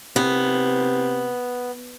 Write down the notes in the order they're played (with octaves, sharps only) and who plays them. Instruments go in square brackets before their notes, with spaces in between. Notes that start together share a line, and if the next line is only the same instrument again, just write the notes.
[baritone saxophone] C3 [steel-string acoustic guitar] B3